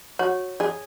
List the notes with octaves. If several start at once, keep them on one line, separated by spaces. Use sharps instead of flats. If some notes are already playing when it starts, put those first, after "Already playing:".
F#4 C#5
G#4 D5